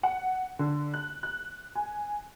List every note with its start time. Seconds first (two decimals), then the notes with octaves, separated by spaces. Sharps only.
0.03 F#5
0.59 D3
0.94 F#6
1.23 F#6
1.75 G#5